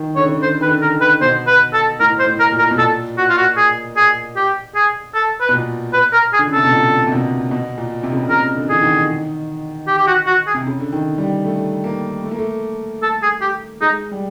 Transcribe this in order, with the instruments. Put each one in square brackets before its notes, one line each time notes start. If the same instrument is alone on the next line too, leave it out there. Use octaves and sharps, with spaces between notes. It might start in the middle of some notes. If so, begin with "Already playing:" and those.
Already playing: [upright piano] D#3
[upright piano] D3 [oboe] C#5
[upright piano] C#3
D3
[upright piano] D3 [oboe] C5
[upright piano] D#3 [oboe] B4
[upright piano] D3
[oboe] A#4
[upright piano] D#3
[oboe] B4
[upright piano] B2 [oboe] C5
[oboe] B4
A4
[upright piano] A2 [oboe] A#4
[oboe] C5
[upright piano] A2
[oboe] A#4
[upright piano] A#2
[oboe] A#4
[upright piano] B2
[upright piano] A#2 [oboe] A4
[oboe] F#4
F4
F#4
G#4
G#4
G4
G#4
A4
B4
[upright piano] B2
A#2
[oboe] B4
A#4
G#4
[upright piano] D3
C#3
[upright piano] C3 [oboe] A4
[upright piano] B2
A#2
C3
B2
B2
A#2
C3
C#3
C3
[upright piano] C#3 [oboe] A#4
[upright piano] D3
[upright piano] E3 [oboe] G#4
[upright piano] D#3
[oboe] G4
G4
F#4
F#4
G#4
[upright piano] C3
C#3
D3
D#3
G3
A3
A#3
A3
A#3
A3
[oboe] A4
G#4
G4
[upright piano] G#3 [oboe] D#4
[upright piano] G3